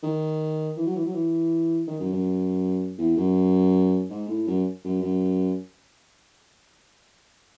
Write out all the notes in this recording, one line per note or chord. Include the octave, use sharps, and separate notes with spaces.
D#3
E3
F#3
E3
F#3
E3
D#3
F#2
F#2
E2
F#2
G#2
A2
F#2
F#2
F#2